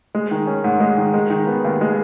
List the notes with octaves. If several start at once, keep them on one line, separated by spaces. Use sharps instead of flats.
G#3
D#3
C#4
G#2
G#3
D#3
G#3
D#3
B3
D#2
G#3